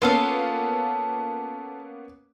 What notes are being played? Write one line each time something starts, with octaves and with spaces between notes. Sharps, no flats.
A#3 B3 C#4 F4 A4 F5